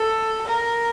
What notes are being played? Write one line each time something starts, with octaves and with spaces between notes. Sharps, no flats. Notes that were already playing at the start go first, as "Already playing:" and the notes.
Already playing: A4
A#4